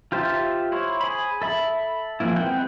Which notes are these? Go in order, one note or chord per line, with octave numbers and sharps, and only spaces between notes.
F4 G4 C5 E5 A5
E4 C5 C#5
G#4 B5
A4 E5 B5
E3 F3 A#3 E4
G#3 B3 C4 F#5 G5